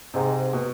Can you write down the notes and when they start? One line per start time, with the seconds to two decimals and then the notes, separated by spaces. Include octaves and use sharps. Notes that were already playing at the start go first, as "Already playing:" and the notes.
0.14 G#2 C3
0.53 B2